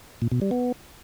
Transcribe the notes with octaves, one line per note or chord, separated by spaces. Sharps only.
A#2
B2
G3
B3